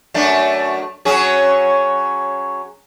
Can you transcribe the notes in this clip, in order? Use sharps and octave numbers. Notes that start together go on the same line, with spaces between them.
F#2 A3 D4
F#3 C#4 G#4